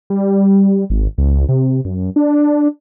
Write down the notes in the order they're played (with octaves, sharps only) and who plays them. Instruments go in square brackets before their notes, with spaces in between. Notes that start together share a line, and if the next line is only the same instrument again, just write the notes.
[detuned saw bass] G3
G#1
C#2
C3
F#2
D4